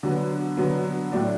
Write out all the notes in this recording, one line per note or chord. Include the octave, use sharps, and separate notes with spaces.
D3 F#3 B3
D3 F#3 B3
A2 F#3 A3 D4